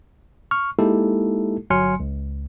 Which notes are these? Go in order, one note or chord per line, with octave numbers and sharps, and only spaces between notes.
C#6 F6
G#3 A#3 D#4 E4 G4 A4
G1 F#3 G#5 C6 F6 C#7
C#2